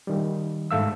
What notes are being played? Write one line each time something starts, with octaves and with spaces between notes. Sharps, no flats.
D#3 G3
G#2 A3 F5 E6